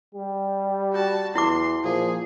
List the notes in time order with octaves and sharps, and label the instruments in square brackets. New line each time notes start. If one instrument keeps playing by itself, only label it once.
[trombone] G3 [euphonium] G4
[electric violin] F#4 A5
[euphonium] E2 [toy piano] E4 D6 [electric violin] C6
[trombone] A#2 [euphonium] F3 [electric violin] G#4